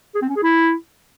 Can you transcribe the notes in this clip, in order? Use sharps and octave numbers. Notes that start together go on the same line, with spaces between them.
G#4
C4
C#4
G#4
E4